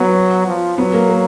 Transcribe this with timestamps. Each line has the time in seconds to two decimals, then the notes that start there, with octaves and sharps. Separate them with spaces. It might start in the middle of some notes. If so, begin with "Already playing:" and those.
Already playing: F#3 B3
0.47 F3
0.78 F#3 B3
0.94 A#3
1.09 A#3